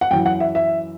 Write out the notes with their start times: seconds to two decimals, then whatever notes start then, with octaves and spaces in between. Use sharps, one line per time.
0.01 F#5
0.11 F#2 E3 G5
0.26 F#5
0.40 E5
0.55 E5